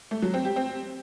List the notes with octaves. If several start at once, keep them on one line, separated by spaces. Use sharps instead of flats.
A3
F#3
C4
G4
C4